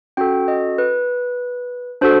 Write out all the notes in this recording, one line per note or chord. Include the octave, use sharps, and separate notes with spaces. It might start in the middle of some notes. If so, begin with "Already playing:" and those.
C#4 F#4 A4 G5
D#5
B4
D4 F#4 A4 C5